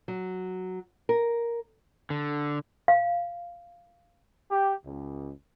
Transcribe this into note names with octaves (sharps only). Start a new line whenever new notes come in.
F#3
A#4
D3
F5
G4
C#2